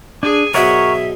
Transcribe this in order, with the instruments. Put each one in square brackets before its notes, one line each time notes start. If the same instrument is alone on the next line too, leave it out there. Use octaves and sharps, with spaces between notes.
[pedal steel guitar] D4 [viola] G#4 G#5
[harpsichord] G#2 B2 F#3 [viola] G#4 [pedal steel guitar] A#4 C#5 F#5 [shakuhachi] E5